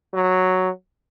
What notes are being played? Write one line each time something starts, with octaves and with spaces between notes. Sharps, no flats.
F#3